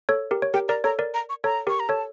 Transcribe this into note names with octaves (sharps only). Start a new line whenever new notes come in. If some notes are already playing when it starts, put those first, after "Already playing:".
A4 C#5
G4 A#4
C#5
G4 A#4 G5
A#4 D5 A#5
A4 C#5 A#5
A#4 D5
A#5
C#6
A4 C#5 A#5
G4 A#4 C#6
A#5
A4 C#5 A5